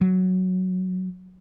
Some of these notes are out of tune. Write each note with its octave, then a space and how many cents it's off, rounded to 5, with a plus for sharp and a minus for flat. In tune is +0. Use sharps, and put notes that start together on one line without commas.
F#3 +0